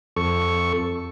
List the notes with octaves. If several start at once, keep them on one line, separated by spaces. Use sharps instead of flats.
F2 A4 C#6